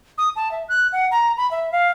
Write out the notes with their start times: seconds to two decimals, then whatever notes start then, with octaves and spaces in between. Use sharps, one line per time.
0.18 D#6
0.36 A5
0.51 E5
0.69 F#6
0.93 F#5
1.11 A#5
1.37 B5
1.51 E5
1.72 F5